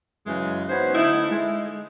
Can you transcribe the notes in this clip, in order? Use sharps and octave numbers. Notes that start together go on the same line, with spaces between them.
F#2 C#3 E3 G#3
B3 C#4 D#4 F#4 B4 C5
D3 A3 D#4 E4
G#3